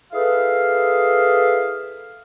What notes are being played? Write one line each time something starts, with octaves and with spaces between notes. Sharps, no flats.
E4 G#4 A4 B4 F5